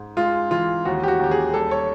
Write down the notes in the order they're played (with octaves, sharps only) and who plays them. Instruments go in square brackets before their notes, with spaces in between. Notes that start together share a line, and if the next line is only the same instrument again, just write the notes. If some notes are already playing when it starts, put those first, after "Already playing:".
Already playing: [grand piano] G#2
G#3 F4
E3 F4
D#2 F#4
G4
F#4
D#2 G4
G#4
G3 A4
C#5